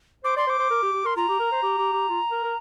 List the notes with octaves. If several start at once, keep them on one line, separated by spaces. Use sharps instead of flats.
C5 D6
D5 C6
C5 D6
C5
A#4
G4
G4
A#4 C6
F4 A#5
G4
A#4
C5
G4
G4
G4
F4
A#4
A#4